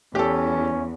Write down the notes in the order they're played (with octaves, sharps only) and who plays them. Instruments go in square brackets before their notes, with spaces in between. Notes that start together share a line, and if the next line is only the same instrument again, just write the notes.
[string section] E2 [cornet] C#4 [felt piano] G4 A4